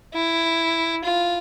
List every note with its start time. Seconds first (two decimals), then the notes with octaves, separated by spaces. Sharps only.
0.14 E4
1.04 F4